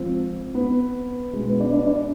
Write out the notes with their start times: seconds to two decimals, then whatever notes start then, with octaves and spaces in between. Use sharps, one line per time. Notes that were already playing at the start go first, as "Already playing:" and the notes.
Already playing: G#2 F3 C4
0.54 B3 B4
1.33 B2 G#3 G#4
1.47 B3 B4
1.60 D4 D5
1.73 D4 D5
1.86 D4 D5